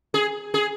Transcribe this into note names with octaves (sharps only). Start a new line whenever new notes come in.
G#4
G#4